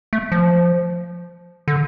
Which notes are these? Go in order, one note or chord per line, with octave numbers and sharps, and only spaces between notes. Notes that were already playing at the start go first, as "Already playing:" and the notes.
A3
F3
D3